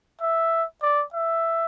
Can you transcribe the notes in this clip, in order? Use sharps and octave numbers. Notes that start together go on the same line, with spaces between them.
E5
D5
E5